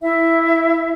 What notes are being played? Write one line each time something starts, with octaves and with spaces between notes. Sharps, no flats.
E4 E5